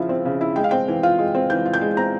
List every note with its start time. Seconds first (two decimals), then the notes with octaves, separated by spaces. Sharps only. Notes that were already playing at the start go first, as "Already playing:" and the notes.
Already playing: C#3 F3 E4 E5
0.09 C4
0.25 C#3
0.41 E4
0.56 G#3 G5
0.64 F5
0.71 C4 G5
0.88 E3
1.03 F4
1.19 G#3
1.35 C4
1.50 E3 G6
1.66 F4
1.74 G6
1.81 G#3
1.97 C4 A#5